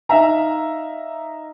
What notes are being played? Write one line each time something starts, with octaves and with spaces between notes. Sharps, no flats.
D#4 E5 F5 A#5